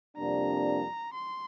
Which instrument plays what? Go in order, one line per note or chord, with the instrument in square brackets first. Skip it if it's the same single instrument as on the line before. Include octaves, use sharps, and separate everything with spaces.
[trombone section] F2 C3 G3 A#3 D4 [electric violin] A#5
[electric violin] C6